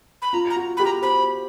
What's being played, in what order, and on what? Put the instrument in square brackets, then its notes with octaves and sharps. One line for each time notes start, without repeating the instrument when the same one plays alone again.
[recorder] B5
[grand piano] F4 [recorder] A#5
[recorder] A#5
[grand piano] F#4
[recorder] B5
[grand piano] G4
[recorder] A#5
[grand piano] C5 [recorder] B5